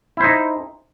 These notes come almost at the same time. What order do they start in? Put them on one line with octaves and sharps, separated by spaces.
E4 C5 D#4